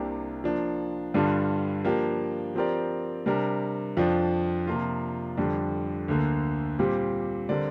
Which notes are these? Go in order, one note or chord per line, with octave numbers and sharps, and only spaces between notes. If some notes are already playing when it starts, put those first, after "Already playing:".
Already playing: C2 C3 A#3 D4 G4
F3 A#3 D4
G2 D3 G3 D4 F4
F3 A#3 D4 G4 A#4
F3 C4 G4 A#4 D5
C3 G3 D4 A#4
F2 F3 D4
C3 F3 A#3 D4 F4
F2 D3 G3 D4
D2 D3 A#3
A#2 G3 C4 G4
D3 G3 C4 A#4 D5